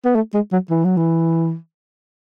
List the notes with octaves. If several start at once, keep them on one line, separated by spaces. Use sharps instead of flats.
B3
A3
G#3
F#3
E3
F#3
E3